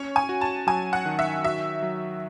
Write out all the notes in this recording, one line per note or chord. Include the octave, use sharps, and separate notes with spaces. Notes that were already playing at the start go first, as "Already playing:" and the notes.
Already playing: C#4 C#5
G#5
F#4
A5
F#3 G#5
F#5
D#3
E5
F#4 E5
F#3